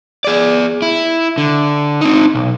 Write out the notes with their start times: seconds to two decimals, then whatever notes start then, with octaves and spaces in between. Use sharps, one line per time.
0.25 G#4 D5
0.82 E4
1.38 D3
2.01 C4 D#4
2.35 B1